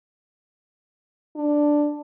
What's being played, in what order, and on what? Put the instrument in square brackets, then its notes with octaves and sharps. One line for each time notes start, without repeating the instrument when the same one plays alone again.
[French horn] D4